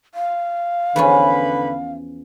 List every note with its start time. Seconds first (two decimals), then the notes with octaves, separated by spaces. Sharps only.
0.15 F5
0.96 E2 D3 F3 C#4 B4 B5